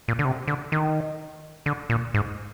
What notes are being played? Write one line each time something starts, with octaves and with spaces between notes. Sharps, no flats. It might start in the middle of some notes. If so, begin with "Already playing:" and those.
A#2
D3
C3
D3
D#3
D3
A#2
G#2